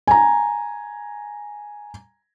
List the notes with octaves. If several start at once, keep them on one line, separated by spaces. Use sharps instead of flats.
G#5 A#5